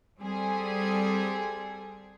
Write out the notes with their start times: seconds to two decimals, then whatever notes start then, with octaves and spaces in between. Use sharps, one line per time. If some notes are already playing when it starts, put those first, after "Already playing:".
0.20 G3 C4 G#4 A4